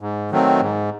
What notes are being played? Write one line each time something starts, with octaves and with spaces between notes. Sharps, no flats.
G#2
D#3 F#3 A3 C4
G#2